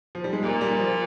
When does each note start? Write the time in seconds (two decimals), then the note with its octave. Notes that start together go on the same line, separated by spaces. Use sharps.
0.15 F3
0.24 G3
0.33 G#3
0.43 A#2 A#3
0.61 G3
0.79 F3